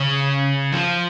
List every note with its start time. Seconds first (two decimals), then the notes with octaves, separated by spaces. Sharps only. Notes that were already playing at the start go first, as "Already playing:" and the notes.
Already playing: C#3
0.72 F3